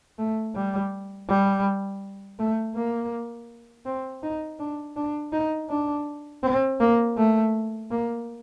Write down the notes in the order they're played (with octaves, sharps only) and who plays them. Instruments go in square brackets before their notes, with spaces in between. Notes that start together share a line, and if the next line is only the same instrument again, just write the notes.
[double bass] A3
G3
G3
A3
A#3
C4
D#4
D4
D4
D#4
D4
C4
A#3
A3
A#3